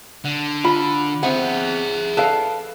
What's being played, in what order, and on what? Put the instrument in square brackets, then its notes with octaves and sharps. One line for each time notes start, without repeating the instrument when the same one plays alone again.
[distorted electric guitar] D3
[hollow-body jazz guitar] F4 [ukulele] B5
[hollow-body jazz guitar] C4 F#5 [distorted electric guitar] G#4 E5
[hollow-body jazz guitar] A4 D5 [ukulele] B4 F5